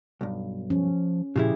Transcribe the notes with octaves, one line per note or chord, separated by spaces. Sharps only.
B1 G2
F3 C#4
A#2 C#3 F3 E4 G4 G#4